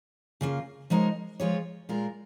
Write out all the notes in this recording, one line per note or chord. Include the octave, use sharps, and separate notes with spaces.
C#3 A#3 F4
F3 G#3 D#4 A#4 C#5
F3 G#3 F4 C#5
A#2 G#3 F4 A#4